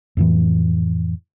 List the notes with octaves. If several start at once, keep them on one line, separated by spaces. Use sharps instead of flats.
F2 A2 E3